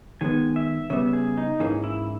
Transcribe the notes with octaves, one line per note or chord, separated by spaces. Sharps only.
D#3 G#3 B3 G#5
E5
C#3 G3 B3 E5
G#4
D#4
G#2 E3 A#3 C#4 G#4
E4